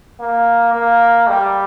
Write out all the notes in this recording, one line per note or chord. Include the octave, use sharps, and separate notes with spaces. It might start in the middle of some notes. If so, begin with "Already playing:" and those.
A#3
A#3
G3